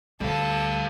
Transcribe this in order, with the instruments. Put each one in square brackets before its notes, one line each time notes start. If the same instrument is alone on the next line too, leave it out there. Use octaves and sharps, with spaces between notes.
[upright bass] D2 [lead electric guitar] G3 F5 [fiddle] A4